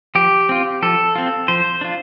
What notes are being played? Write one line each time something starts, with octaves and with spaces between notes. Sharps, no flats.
F3 G4
C4 F4
F3 A4
C4 F4
F3 C5
D4 F4